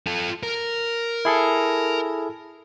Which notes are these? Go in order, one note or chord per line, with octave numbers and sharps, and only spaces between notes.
F4 A4
A#4
E4 G#4 A4